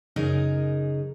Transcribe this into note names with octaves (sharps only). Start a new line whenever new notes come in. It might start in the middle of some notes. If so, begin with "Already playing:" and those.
F#2 C#3 D#4 G#4 A#4 D#5